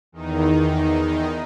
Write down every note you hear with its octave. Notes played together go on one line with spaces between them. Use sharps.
E2 D#3 D#4